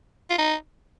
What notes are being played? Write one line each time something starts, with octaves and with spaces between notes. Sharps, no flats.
F4
D#4